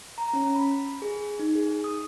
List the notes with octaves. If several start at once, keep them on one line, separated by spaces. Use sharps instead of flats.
A#5
C#4
B5
G#4
D#4
G#4
D#6